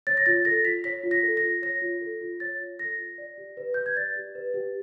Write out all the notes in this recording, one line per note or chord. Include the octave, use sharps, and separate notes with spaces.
C#5 A6
A#6
F4 A6
A4 A#6
F4 B6
C#5 B6
F4
A#6
A4
A#6
F4
C#5 A#6
F4
A4
F4
C#5 A6
F4
A4 A#6
F4
D5
G4
B4
G4 G6
G#6
D5 A6
G4
B4
G4